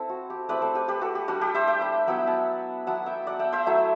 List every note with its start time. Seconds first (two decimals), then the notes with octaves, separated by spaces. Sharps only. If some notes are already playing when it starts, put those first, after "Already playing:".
Already playing: C4 E4 A4
0.09 F#4
0.30 G4
0.49 A3 C4 E4 B4 D5
0.62 A4 C5
0.75 G4 B4
0.88 G4 B4
1.01 F#4 A4
1.15 G4
1.28 G3 D4 F#4
1.41 G4
1.54 C5 E5
1.67 E5 G5
1.81 G5 B5
2.07 F#3 B3 E4 G5 B5
2.27 F#5 A5
2.87 F#3 B3 E4 F#5 A5
3.06 E5 G5
3.27 D5 F#5
3.39 E5 G5
3.52 C5 E5
3.66 F#3 A3 E4